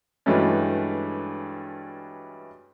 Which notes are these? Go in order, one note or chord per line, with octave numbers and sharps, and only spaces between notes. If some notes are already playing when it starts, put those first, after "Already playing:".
G2 E3 F#3 G#3 A3 C#4